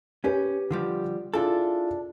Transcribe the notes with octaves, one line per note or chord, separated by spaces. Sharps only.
C#4 G4 B4 C#5
D3 F3 G3
D4 E4 F4 G#4 A4